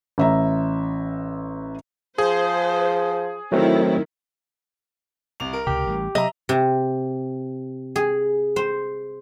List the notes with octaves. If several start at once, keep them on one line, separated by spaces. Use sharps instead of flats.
A1 E5 A#5
F3 G#4 C5
D#3 F#3 A3 C4 E4
C2 F7
A#4
C#2 C3 G4
A1 E3 G3
C3 F#3 D#5 E5 A#5
C3
G#4
C5